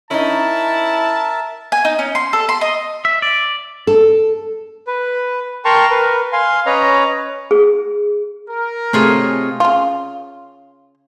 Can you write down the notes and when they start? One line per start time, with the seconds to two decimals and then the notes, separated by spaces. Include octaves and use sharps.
0.11 C#4 D#4 E4 A#4 E5 A5
1.72 G#5
1.85 D#4
1.99 C#4
2.15 C6
2.33 A4
2.49 C6
2.61 D#5
3.05 E5
3.22 D5
3.87 A4
4.87 B4
5.65 A#4 G5 A5 A#5 C6 C#6
5.90 A#4 B4
6.33 F5 G#5 C6
6.66 C#4 B4 C#5 D#5 A#5
7.51 G#4
8.48 A#4
8.93 C3 A3 F4 G#4 C#5 D#5
9.60 C#3 F4